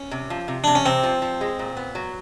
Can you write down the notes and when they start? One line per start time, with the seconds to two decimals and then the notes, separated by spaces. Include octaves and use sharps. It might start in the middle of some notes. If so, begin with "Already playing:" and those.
Already playing: C#4
0.11 C3
0.30 F3
0.48 C3
0.64 C3 D4
0.75 C#4
0.85 C3 C4
1.03 F3
1.22 F3
1.41 G#3
1.59 A#2
1.77 B3
1.95 F#3